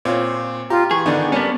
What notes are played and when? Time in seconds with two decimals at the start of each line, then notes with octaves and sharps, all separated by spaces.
0.05 A#2 C4 F4 C#5
0.70 F4 G4 A#5
0.91 E3 G#4 C#6
1.06 D3 D#3 B3 D#4 D5
1.32 G3 B3 C#4 D4 A#4